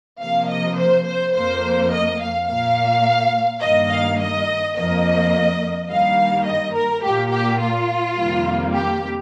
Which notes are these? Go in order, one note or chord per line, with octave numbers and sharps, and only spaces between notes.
C3 F3 A#3 F5
D#5
C5
C5
F2 F3 A#3 C5
D#5
F5
A#2 A#3 F5
G2 D#3 A#3 D#5
F5
D#5
F2 F3 A#3 D#5
G2 D#3 G3 A#3 F5
D#5
A#4
A#2 A#3 G4
G4
F4
F2 C3 D#3 G3 A#3
G4